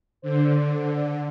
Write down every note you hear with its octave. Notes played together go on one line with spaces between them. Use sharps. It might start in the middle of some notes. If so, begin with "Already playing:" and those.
D3 C5